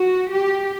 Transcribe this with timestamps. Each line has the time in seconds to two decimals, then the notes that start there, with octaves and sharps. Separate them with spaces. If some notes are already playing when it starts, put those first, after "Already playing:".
Already playing: F#4
0.31 G4